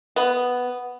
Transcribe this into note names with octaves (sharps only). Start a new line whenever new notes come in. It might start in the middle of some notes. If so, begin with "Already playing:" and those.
B3